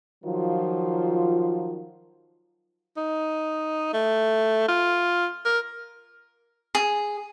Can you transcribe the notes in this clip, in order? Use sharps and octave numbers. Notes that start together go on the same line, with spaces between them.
D#3 F3 F#3 F4
D#4
A3
F4
A#4
G#4